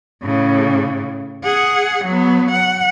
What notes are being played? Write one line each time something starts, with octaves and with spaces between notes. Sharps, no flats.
A2 C#3
G#4 F#5
F#3 B3
F#5